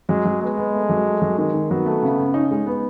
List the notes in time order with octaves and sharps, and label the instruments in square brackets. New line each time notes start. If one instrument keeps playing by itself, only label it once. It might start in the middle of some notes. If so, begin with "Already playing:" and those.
[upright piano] F#3 [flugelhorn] G#3
[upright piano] F#3
[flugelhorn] G#3 [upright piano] B3
[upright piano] B3
A3
F#3
A3
F#3
[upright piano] D#3 [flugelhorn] G#3
[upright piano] D#3
[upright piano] F#3 [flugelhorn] B3
[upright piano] A3
C#3
C#3
[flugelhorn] C#4 [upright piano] D#4
[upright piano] G#3
B3